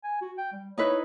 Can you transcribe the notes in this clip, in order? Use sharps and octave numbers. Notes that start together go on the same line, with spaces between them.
G#5
F#4
G5
G3
D#4 E4 B4 C#5